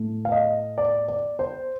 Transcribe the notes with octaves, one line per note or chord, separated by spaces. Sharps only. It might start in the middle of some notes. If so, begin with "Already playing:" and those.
Already playing: A2 A3
F5
D#5
D5
D5
C5